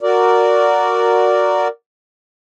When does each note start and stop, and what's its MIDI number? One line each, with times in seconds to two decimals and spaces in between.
0.01 1.68 66
0.01 1.68 70
0.01 1.68 74